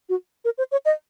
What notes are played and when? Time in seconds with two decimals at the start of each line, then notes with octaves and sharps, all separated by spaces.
0.09 F#4
0.45 A#4
0.58 C5
0.72 C#5
0.85 D#5